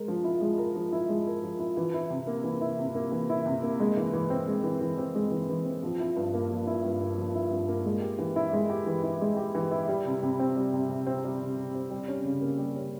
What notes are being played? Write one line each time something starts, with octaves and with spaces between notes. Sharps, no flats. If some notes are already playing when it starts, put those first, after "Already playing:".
Already playing: G#3 A#4
F3
E4
G#3
A#4
F3
E4
G#3
A#4
F3
E4
E3
E4
C3
A#3
E3
E4
C3
A#3
E3
E4
C3
A#3
G#3
E3
E3
C4
G#3
E3
E3
C4
G#3
E3
E3
C4
F3
E4
G2
A#3
F3
E4
G2
A#3
F3
E4
G2
A#3
G#3
G4
E3
E4
G#3
G4
E3
E4
G#3
G4
E3
E4
G3
C3
C3
C4
G3
C3
C3
C4
G3
C3
C3
C4
G3
C#4
C#3
A#3
G3
C#4